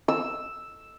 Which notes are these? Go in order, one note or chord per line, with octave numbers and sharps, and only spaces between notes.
E6